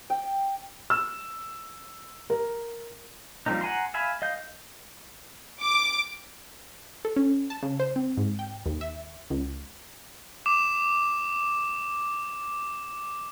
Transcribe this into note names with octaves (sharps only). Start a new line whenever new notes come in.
G5
E6
A#4
F3 G3 A#3 C4 D#4
F#5 G#5 A#5 C6
E5 F5 G#5 B5
D#5 F5 G6
D6
A4
C#4
A5
C#3
C5
C4
G#2
G5
D#2
E5
C#2
D6 E7